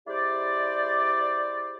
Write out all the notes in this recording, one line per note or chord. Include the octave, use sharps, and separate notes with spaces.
G#3 E4 G4 C5 D5